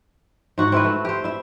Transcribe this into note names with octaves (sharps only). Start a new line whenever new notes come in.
G#2 F#4 F#5
C4 E4 B4
A3
G4 C5
E4 E5